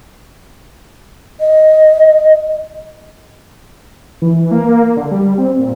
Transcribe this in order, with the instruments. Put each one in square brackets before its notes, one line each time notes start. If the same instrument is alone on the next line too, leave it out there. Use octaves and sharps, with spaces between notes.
[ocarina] D#5
[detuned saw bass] E3
A#3
D3
G3
C4
A#2